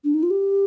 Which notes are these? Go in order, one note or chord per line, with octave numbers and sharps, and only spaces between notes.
D4
D#4
F4
G4